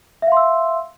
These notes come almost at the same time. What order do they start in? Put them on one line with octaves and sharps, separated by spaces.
E5 F5 C6 E6